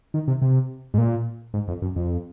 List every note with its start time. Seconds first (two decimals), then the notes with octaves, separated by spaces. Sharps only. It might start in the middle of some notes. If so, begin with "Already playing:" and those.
0.14 D#3
0.28 C3
0.42 C3
0.94 G#2
0.98 A#2
1.54 G#2
1.68 F2
1.82 F#2
1.96 F2